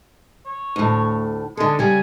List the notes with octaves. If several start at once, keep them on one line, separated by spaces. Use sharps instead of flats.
C#5
D2 A2
D3 G#3 A4
C#3 G3 G#5